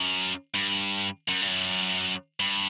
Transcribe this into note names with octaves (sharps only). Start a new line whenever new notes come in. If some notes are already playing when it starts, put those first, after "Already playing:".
Already playing: F#2
G2
F#2
G2
F#2
G2